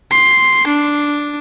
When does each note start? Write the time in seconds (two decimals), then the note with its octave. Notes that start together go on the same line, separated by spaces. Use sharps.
0.12 C6
0.67 D4